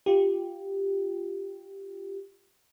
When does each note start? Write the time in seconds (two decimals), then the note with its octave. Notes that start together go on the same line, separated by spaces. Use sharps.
0.06 F4 G4